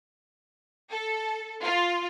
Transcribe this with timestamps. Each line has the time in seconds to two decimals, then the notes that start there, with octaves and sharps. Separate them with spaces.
0.91 A4
1.64 F4